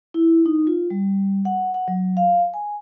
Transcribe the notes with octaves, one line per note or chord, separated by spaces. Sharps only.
E4
D#4
F4
G3
F#5
F#5
F#3
F5
G#5